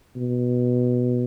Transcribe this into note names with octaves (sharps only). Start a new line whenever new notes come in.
B2